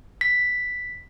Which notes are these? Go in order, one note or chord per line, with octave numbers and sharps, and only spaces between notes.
B6